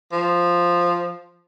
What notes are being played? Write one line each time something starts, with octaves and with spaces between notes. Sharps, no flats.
F3